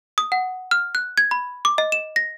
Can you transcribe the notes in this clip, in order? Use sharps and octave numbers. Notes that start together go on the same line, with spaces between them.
D#6
F#5
F6
F#6
G#6
B5
D6
D#5
E7
A#6